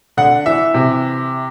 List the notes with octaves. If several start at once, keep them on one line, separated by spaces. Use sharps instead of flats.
D3 F#5
E3 E5
C3